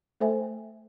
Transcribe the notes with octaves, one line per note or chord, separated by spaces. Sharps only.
A3 A4 C5 E5 G5 G#5